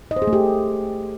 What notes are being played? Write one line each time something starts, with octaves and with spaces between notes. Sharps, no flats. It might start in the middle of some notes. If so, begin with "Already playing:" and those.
D#5
C5
G#4
A3
G4